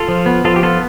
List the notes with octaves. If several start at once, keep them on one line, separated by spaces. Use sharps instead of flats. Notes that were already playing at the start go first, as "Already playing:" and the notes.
Already playing: F4 A4
F3
B3
F3 F4 A4
G4
B3 F4 A4